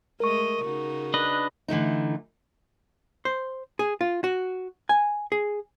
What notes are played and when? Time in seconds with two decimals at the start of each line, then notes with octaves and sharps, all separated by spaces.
0.20 G#3 A3 A#4 D#5 C#6
0.65 C#3 D#4 F#4
1.14 D4 B4 D#5
1.68 D3 E3 A3 D#4
3.25 C5
3.79 G#4
4.01 F4
4.24 F#4
4.89 G#5
5.32 G#4